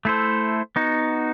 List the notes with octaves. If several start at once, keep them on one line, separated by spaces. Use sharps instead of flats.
A3 E4 A4 C5
B3 D#4 F#4